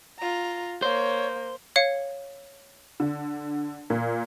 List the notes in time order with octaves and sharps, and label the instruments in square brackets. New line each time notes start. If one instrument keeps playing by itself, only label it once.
[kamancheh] F4 A#5
[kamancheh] A#3 [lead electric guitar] C5 [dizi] C#5
[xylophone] C#5 F5 C#7
[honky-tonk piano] D3
A#2